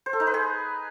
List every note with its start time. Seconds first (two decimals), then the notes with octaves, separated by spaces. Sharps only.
0.06 C5
0.13 A4
0.20 D#4
0.27 B4
0.34 G#4